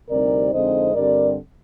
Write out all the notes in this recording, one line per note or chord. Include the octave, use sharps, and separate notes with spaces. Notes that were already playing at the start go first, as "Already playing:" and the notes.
D2 C3 G3 C4 D#4 A#4 D5
F2 D3 G#3 C4 D#4 C5 D#5
G2 D3 G3 C4 A#4 D5